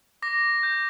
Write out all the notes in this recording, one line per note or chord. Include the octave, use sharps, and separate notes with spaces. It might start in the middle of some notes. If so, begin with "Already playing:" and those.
D6 A#6
G6